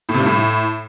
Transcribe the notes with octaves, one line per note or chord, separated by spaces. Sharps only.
A2
C3
G2
A2